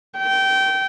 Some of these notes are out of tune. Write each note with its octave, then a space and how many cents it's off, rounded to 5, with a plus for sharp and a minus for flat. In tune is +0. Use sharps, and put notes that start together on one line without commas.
G5 -20